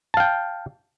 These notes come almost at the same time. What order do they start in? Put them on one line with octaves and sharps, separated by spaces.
A5 F5 G5